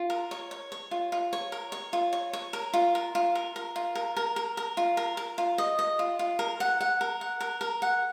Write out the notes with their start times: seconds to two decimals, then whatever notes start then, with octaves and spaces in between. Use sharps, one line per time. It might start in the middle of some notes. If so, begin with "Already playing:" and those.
Already playing: F4
0.10 A#4
0.31 C#5
0.51 C#5
0.72 C#5
0.91 F4
1.12 F4
1.33 C#5
1.52 A#4
1.72 C#5
1.93 F4
2.13 C#5
2.33 C#5
2.53 A#4
2.73 F4
2.95 A#4
3.15 F4
3.35 A#4
3.56 A#4
3.76 F4
3.95 A#4
4.17 A#4
4.36 A#4
4.57 A#4
4.77 F4
4.97 A#4
5.17 A#4
5.38 F4
5.58 D#5
5.79 D#5
5.99 F4
6.19 F4
6.39 A#4
6.60 F#5
6.81 F#5
7.01 A#4
7.21 F#5
7.41 A#4
7.61 A#4
7.82 F#5